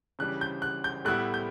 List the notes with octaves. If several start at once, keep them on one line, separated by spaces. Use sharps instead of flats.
C#3 E3 G3 D4 F#6
G6
F#6
G6
A2 G3 B3 E4 F#6
G6